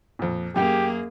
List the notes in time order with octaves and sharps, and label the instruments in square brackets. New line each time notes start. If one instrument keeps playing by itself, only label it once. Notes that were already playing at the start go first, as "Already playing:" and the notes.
[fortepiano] F2 A#2
[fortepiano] F#2 G5 [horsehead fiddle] A#3 G#4 [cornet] G4